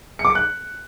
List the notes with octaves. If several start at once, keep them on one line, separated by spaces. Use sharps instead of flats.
C#7
D6
C#7
F#6